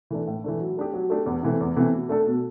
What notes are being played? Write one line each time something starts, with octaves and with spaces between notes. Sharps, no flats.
E3 A3 D4
A2
E3 A3 D4
F#3
A3 D4 G4
F#3
A3 D4 G4
E2
C3 E3 A3
E2
C3 E3 A3
B2
A3 D4 A4
B2